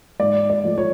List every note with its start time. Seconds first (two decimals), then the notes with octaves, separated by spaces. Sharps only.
0.20 G#2 D5
0.50 D5
0.63 F3 A3
0.78 C#5